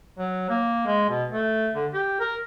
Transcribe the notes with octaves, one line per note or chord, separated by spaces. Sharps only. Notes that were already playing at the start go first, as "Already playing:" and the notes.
F#3
A#3
G#3
B2
A3
D3
G4
A#4